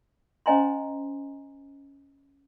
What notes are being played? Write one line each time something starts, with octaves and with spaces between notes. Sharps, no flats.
C#4 C5 D#5 G#5 A#5 C6